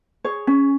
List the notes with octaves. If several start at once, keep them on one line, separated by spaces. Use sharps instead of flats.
G#4 C#5
C#4